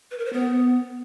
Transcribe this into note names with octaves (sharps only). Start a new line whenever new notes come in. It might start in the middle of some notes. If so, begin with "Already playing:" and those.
B4
A#4
C5
B3